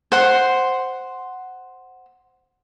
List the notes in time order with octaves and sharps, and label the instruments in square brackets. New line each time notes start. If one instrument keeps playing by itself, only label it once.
[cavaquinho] C5 F#5 C6